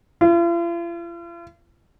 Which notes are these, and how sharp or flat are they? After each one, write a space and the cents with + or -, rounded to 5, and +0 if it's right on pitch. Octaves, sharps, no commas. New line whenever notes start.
F4 -45